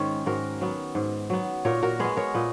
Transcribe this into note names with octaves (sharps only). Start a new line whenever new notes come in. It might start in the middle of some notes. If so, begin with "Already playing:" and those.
Already playing: G#2 D#3 G#3 C#4
G#2 F#4 A#4
F#3 B3
G#2
F#3 B3
A#2 A#4 C#5
F#4 A#4
G#3 B3 G#4 B4
A#4 C#5
A#2 B4 D#5